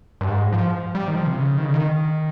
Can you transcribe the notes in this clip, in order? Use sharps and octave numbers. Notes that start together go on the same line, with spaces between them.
G2
G#2
F3
G3
D#3
F3
C3
C#3
D#3
C#3
D#3